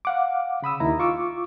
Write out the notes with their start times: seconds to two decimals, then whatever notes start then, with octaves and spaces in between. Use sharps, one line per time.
0.05 F5 F#5 D6
0.62 C#3 B5 D#6 E6
0.80 D#2 D#3 E4 A#5
0.99 F4 C#6 D6 E6